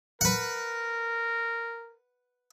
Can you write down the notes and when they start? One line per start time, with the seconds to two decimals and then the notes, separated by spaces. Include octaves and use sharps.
0.21 A#4 B4 F#5